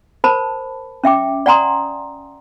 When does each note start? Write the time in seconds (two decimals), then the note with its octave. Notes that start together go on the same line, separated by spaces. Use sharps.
0.24 A#4 C5 A5 B5
1.04 C#4 E5 G5 D6
1.46 D5 F#5 G#5 A#5 C6 D#6